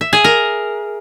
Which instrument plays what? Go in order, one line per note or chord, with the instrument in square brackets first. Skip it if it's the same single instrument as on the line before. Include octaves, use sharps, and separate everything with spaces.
[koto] E5
G#4
A#4